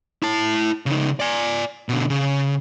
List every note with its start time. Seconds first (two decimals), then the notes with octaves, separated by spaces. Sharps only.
0.23 E4 A5
0.86 C#3 D#4
1.20 D5 G#5
1.89 B2 D3
2.10 C#3